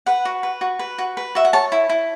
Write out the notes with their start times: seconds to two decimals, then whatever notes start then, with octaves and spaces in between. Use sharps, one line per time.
0.06 B4 F#5
0.25 F#4
0.43 B4
0.61 F#4
0.79 B4
0.98 F#4
1.17 B4
1.35 F#4 E5
1.45 F#5
1.53 C#5 A5
1.72 E4
1.89 E4